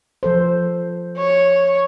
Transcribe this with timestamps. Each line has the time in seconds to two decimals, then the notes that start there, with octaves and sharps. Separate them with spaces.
0.23 F3 A4 C5
1.17 C#5